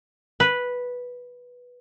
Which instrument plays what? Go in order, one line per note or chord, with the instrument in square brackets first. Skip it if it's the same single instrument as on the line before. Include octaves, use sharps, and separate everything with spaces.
[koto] B4